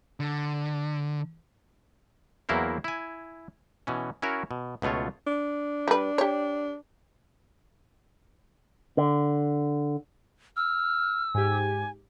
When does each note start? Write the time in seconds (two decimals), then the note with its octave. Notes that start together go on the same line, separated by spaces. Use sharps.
0.20 D3
2.49 E2 F#3 A#3 E4 A#4 C5
2.84 E4 G#5
3.87 B2 E3 C#4
4.22 C#4 E4 F#4 A#4 C#5
4.51 B2
4.82 C#2 B2 A3 F4 C#5
5.27 D4
5.88 G3 B4
6.18 G4 C#5
8.97 D3
10.56 E6 F6
11.34 G#2 G4 G#5